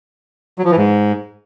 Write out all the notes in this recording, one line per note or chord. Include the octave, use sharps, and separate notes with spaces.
F#3
F3
E3
G#2